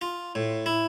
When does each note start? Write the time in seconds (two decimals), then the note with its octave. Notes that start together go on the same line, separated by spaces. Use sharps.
0.01 F4
0.35 A2
0.66 E4